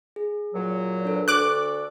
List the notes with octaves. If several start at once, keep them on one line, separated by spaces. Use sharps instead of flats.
G#4
A#2 F#3
D4 A4 B4
D2 D3 A4 C#6 D6 F#6